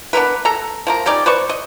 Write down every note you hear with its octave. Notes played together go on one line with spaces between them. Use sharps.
B3 D4 A#4 B4
A4 A#5
F3 A#3 A#4
G3 C#4 D#4 D5
B4 C5 D5 C#6
D#5